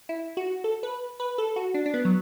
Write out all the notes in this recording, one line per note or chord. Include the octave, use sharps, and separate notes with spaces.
E4
F#4
A4
B4
B4
A4
F#4
D4
D4
B3
F#3